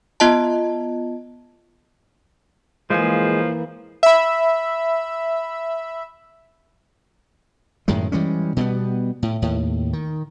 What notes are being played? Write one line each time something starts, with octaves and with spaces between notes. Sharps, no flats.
B3 F4 D#5 A5
E3 F3 G#3 A#3 G#4
E5 B5
F#2 A2 D#3 G#3
E3 G3 G#3 C#4
B2 G3 G#3 B3
A2
D#2 A2
D#3